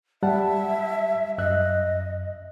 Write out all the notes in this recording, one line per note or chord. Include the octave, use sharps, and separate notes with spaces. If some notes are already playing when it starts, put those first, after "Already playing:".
G3 E5 F#5 A5
F#2 D#5 E5 F#6